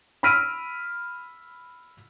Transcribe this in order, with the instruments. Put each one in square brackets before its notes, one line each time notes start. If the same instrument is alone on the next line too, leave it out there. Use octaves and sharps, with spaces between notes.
[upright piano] B5 E6 F6 B6 D7 D#7